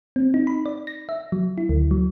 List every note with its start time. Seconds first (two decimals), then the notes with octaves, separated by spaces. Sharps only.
0.16 C4
0.34 D#4
0.47 B5
0.66 D5
0.87 A#6
1.09 E5
1.32 F#3
1.58 E4
1.69 D2
1.91 F#3